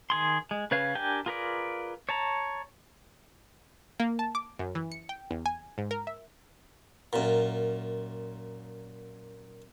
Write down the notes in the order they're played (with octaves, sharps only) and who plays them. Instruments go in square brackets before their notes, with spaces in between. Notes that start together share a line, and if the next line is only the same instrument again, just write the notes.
[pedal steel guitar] D#3 G#4 C6
G#3
C#3 B4 C#5 F5
D4 G4 A#4 G5 G#5
F4 G#4 A#4 B4 D5
C#5 A5 A#5
[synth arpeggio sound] A#3
A5
D6
F#2
E3
C#7
G5
E2
G#5
G#2
A#4
E5
[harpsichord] F#2 A#2